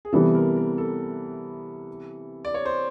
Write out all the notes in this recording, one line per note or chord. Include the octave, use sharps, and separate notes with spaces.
G#4
C3 E3 G3 B3 A4
A#4
A#4
A4
D5
C#5
C5